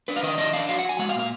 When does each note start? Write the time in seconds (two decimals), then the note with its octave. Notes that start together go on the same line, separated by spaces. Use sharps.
0.08 D4 B4
0.16 F5
0.23 D#3 D#5
0.38 D4 D#5
0.53 D4 F5
0.69 F#3 F5
0.79 F#5
0.84 F#3 G#5
0.99 G#3 F#5
1.09 F5
1.14 A#2
1.19 F5